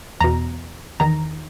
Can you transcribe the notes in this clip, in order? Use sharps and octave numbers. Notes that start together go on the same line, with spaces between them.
E2 B2 A#5
E2 D#3 A#5